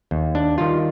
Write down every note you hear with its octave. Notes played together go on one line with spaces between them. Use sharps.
D#2
D4
D#3 G3 F4